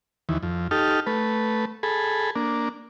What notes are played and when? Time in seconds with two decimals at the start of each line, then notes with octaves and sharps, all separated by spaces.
0.29 D#2 E3
0.43 F2
0.71 D#4 G4 A4 F6
1.07 A3 B4
1.83 G#4 A4 B5
2.36 A#3 D4